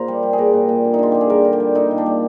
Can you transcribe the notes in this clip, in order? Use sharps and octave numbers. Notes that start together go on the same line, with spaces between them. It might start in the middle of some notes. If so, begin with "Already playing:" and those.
Already playing: A#2 A#4 C5
G3
G3
G#4
A#2 A#4
A#2
A#2
D3
D#4
D3 F4
G3 G4
G#4
G3 A#4
D3
G4
G3
A#2 D#4
A#2
D4
G3